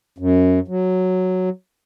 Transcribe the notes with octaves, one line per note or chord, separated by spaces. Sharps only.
F#2
F#3